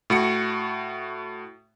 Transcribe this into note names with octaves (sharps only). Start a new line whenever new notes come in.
A2 F#4 C#7